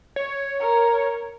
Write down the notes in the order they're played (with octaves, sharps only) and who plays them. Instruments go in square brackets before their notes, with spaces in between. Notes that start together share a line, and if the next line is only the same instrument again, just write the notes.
[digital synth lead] C#5
[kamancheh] A#4